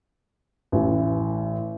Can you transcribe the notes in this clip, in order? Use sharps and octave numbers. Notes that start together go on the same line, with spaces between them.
A1 E3